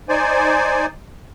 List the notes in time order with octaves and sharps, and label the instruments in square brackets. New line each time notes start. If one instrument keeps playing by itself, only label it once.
[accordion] D#4 C5 D5 G#5